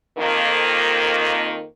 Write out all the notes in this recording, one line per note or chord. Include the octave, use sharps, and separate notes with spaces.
F2 D#3 A#3